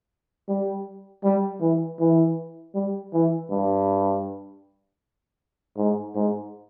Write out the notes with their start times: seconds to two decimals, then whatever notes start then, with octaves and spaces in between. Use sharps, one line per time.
0.48 G3
1.23 G3
1.61 E3
1.99 E3
2.75 G3
3.13 E3
3.50 G2
5.77 G#2
6.16 G#2